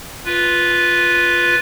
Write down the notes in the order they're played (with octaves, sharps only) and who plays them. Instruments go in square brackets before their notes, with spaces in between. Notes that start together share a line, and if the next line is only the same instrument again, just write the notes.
[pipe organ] F4 B4